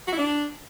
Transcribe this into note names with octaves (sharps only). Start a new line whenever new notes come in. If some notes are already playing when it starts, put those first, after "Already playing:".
F#4
E4
D4